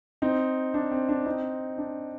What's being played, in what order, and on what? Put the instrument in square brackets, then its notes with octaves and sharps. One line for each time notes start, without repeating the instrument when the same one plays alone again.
[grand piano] C4 D#4
D4
C4
D4
C4 D#4
D4